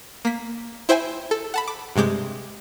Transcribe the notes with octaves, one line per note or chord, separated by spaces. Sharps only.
A#3 B6
E4 C5 E5 G5 G#5
A4
F#5 A5 B5
D6
G2 C3 G#3 D6 G6